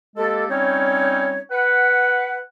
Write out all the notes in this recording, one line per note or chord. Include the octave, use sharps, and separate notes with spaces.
G#3 A#3 G4 A4
G3 C4 C#4 D#4 C#5
B4 F#5